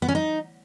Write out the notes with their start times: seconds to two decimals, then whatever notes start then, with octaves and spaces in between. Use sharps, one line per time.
0.02 B3
0.08 C#4
0.15 D#4